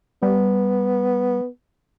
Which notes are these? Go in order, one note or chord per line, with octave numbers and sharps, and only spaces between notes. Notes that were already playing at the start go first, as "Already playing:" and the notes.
G3 B3